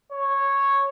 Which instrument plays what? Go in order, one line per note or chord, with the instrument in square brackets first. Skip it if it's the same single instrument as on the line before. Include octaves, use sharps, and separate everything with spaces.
[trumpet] C#5